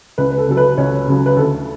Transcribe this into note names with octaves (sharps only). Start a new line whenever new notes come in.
C#2 B4
B4
A4
C#3 F#3 A4
B4
C#2 C#4 C#5
C#3 F#3
B4
D2 A4